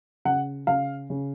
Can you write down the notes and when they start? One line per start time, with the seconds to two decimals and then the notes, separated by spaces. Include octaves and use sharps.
0.25 C#3 F#5
0.67 C#3 F5
1.10 C#3